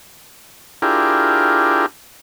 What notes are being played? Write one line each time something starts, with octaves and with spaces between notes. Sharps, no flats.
D4 E4 F4 G4 G#4 A#4